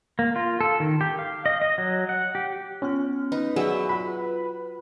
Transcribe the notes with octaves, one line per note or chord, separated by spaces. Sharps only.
A#3
F4
A4
D#3
G4
F5
D#5
D#5
F#3
F#5
G4
B3 C#4 F4 F6
D#4 B4
F#3 G#4 D5 E5 F#5
F4 B5